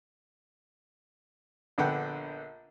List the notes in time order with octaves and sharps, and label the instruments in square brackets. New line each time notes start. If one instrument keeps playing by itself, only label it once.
[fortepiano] A#1 D3 B3 F#5 G5 B5